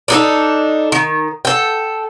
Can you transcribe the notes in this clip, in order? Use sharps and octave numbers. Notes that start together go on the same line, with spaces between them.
D4 D#4 A4
D#3
A4 G5